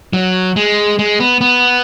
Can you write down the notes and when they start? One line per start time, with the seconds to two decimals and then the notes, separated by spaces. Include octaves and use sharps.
0.13 F#3
0.56 G#3
0.99 G#3
1.20 B3
1.41 B3